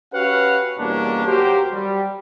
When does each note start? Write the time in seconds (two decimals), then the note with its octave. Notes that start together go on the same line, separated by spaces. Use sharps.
0.14 C#4 F#4 G4 B4 F5 F#5
0.79 E2 B2 G3 A#3 C#4 D4
1.27 D#2 F#3 F#4 G4 A#4 C5
1.73 G3